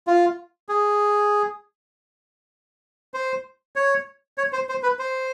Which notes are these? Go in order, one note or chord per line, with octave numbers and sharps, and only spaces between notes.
F4
G#4
C5
C#5
C#5
C5
C5
B4
C5